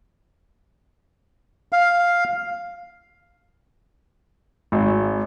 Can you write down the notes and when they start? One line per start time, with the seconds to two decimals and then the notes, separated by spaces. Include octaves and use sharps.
1.72 F5
4.72 G#1